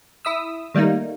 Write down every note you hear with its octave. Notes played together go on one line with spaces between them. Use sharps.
E4 E5 D#6 E6
D#3 G3 A3 A#3 D#4